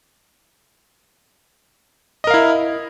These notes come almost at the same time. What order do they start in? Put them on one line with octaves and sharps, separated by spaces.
D#5 A#4 F5 E4